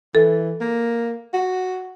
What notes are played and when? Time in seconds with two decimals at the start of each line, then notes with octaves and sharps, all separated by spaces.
0.15 E3 A4
0.61 A#3
1.33 F#4